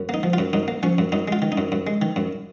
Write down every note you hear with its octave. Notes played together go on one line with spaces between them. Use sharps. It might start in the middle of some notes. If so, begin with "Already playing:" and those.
Already playing: F#2
A#3 D#4
F3
F4
F#2
F#2 D#4
A#3
F3 C#4
F#2
F#2 D#4
G#3 F4
D#3
D#4
F#2
F#2
G#3
D#3
F#2